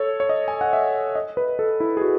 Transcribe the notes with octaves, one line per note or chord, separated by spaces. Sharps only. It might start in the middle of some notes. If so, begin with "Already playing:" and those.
Already playing: A4 C#5
C#5
D#5
G#5
F#5
E5
D#5
B4
A4
E4
G#4
F#4